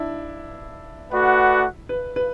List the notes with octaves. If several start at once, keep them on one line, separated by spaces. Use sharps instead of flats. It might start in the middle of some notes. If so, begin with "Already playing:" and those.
Already playing: D4 E4
A3 F#4 B4 D5 F#5
B4
B4